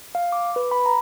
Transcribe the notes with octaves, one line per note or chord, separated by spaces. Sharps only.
F5
D6
B4
B5
A#5